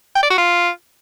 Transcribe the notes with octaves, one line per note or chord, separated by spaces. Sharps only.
G5
D5
F#4
F4